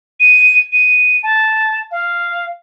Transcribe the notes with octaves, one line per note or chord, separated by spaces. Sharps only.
D#7
D#7
A5
F5